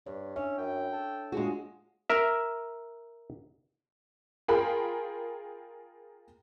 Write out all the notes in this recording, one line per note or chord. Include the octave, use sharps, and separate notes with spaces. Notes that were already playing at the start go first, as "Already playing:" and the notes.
G2 C#5
C#4 D4 C#5 E5
F#2 G5
A4
G#3 D4 F4 F#4 G#4
A#4 E5
F4 G#4 A#4 G5 B5